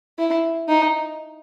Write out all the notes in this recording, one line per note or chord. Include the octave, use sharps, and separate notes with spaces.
E4
D#4